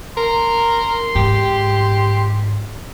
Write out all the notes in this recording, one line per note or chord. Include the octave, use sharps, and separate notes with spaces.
A#4 C6
G#2 G4